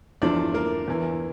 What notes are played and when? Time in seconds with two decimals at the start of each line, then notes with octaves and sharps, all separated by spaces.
0.22 E2 D3 F3 D4 D5
0.54 A#3 A#4
0.88 E2 E3